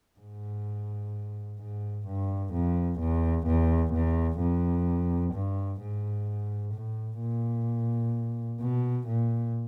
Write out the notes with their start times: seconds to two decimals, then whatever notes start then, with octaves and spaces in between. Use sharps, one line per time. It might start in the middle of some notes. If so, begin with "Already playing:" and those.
0.19 G#2
1.60 G#2
2.07 G2
2.53 F2
2.99 E2
3.47 E2
3.93 E2
4.40 F2
5.33 G2
5.81 G#2
6.74 A2
7.20 A#2
8.61 B2
9.08 A#2